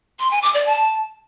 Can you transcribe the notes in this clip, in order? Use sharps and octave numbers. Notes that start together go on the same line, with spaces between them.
C6
G#5
D6
D5
A5